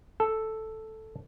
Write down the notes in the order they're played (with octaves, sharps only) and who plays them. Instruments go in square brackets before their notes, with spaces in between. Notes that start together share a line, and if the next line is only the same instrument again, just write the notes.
[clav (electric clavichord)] A4